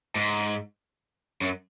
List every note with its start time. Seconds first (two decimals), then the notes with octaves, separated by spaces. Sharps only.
0.15 G#2
1.41 F#2